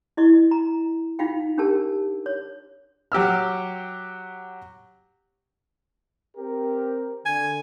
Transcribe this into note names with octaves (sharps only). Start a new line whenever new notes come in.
E4 D#5 C#6
A#5
D#4 F4 F5 G5
C#4 D4 G4 A#4 A5
C#5
F#3 G4 E6 F6
C4 G4 A#4
D3 G#5